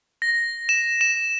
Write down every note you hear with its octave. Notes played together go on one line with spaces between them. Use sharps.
A#6
E7
E7